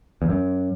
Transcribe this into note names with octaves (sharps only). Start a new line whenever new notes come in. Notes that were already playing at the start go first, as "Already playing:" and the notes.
E2
F#2